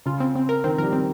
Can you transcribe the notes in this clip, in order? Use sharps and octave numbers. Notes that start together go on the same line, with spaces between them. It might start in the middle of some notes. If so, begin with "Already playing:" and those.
C#3 F4
C4
C4
A#4
D#3 C4
F3 G3 A#4
C4